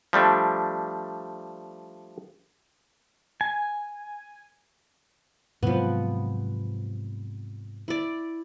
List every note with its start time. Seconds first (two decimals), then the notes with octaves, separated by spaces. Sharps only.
0.13 F3 G3 A3 D4
3.41 G#5
5.63 G#2 C3 F3 F#3 B3
7.88 E4 D5